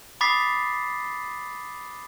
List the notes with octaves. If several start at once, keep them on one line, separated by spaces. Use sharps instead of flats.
B5 D6 D#6 A6 B6 C7